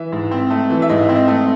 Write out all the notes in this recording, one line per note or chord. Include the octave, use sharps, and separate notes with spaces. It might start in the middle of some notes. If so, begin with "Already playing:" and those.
Already playing: E3 E5
G#2
C4
A3
E3
E5
G#2 D#5
C4
D#5
A3